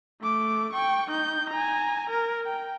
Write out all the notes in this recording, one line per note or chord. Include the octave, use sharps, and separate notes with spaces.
A3 D6
G5 C#6
D#4 G6
G#5 A#5
A#4
G5